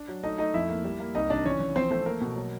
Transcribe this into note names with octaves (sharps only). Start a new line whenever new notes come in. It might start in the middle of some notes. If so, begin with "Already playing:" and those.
Already playing: D4 D5
F#3
A3 D#4 D#5
A3 D#4 D#5
F2 E4 E5
A#3
G3
A#3
C2 D#4 D#5
C3 D4 D5
E3 C#4 C#5
E3
F3 C4 C5
A3 C4 C5
A#3 A#4
B2
F#3